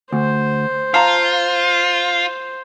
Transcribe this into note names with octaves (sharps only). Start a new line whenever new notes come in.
D2 C5
F4 F5 A5 A#5